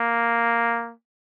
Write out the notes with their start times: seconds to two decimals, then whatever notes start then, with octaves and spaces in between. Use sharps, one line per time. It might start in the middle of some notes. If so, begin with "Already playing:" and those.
Already playing: A#3